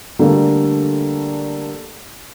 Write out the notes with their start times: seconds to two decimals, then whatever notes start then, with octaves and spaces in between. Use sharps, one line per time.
0.19 D3 G3 A3 A#3 D4